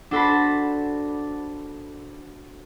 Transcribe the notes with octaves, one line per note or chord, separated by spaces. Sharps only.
D4 F#4 A4 C5 A5 B5